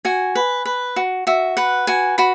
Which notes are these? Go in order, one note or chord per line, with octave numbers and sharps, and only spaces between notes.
F#4 G#5
B4
B4
F#4
F#4 E5
B4 F#5
F#4 G#5
F#4 B5